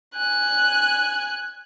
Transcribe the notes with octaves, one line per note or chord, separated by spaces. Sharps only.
G#5 F#6